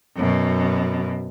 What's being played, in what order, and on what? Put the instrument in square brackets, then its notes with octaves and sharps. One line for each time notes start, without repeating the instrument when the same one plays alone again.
[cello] F#2 B2